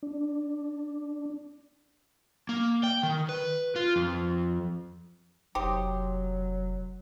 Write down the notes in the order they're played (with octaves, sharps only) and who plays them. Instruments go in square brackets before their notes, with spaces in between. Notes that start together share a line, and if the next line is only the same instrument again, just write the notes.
[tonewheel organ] D4
[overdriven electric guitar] A#3
G5
D#3
B4
F4
F2
[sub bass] F1 [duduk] F#3 [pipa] D#4 G4 C5